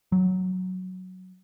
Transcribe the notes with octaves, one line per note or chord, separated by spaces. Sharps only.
F#3